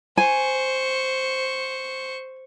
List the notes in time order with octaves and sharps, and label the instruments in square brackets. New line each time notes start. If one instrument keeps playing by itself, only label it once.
[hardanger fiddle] C5 C#6 [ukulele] G#5